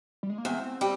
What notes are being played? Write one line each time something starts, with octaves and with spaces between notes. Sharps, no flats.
G3
G#3
A#3
E2 C4
G3